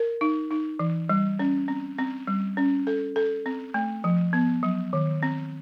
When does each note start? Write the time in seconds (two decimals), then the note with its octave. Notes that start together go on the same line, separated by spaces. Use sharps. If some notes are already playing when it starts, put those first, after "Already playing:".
Already playing: A#4
0.21 D#4
0.51 D#4
0.79 E3
1.09 G3
1.39 C#4
1.68 C4
1.98 C4
2.27 G3
2.57 C#4
2.87 A4
3.16 A4
3.46 C4
3.74 A3
4.04 F3
4.33 B3
4.63 F#3
4.93 D#3
5.23 C4